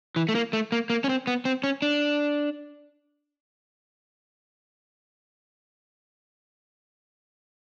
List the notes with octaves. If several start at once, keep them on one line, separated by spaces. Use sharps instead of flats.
E3
A3
A#3
A3
A#3
A#3
C#4
C4
B3
C4
C#4
D4